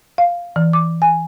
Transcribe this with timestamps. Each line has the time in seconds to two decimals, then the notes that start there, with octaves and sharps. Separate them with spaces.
0.18 F5
0.56 E3
0.73 D6
1.02 G#5